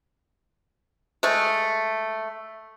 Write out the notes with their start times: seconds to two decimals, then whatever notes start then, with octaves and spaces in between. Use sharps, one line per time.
1.23 G#3 A3